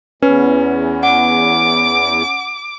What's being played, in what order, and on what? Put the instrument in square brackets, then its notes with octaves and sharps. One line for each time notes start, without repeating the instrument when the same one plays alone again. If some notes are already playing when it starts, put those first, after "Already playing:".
[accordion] E2 [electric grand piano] C#4 [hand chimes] B4
[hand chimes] F#5 [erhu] D6